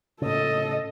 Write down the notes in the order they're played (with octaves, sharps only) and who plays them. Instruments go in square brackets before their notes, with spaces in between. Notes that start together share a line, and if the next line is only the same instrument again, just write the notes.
[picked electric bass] A2 C#3 [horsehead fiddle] A4 D#5